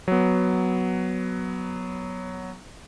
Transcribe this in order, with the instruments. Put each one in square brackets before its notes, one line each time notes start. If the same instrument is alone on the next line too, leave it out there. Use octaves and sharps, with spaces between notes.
[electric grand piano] F#3 B3